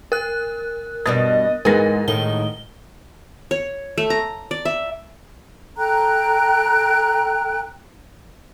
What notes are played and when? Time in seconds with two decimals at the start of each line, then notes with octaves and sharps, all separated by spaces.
0.12 A#4 F#6
1.06 G2 B2 G3 D#5 A6
1.65 G#2 E3 G#3 B3 A#4 A#6
2.08 A2 D#3 G7
3.51 C#5
3.98 A3
4.10 A#5
4.51 D5
4.65 E5
5.77 A4 G5 A#5 F#6